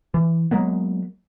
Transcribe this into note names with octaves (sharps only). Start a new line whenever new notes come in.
E3
F#3 G#3 A#3 B3